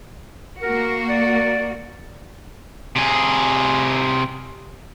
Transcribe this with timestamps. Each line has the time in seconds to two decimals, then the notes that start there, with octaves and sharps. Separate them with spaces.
0.62 A#3 F#4 A#4
1.09 D5
2.96 C3 G#4